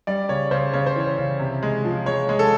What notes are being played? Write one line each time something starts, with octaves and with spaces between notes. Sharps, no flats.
G3 D5
C#3 C#5
C#3 C5
C#3 C#5
C5
E3 C#5
C#3
C3
G#3
F3
G#3 C#5
G#3
A4